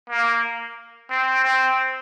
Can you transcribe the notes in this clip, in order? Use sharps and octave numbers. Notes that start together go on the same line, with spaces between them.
A#3
C4
C4